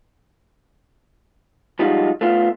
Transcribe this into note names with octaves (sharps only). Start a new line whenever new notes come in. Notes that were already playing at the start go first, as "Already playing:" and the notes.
F3 G3 G#3 D#4 F4 F#4
A3 B3 F4